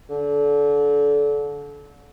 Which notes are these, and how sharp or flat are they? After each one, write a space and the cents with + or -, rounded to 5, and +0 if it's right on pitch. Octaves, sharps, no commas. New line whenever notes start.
D3 -30